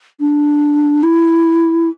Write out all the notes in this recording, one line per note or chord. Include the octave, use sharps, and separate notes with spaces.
D4
E4